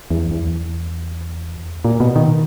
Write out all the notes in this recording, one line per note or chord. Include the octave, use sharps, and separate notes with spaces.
E2
E2
A#2
B2
D#3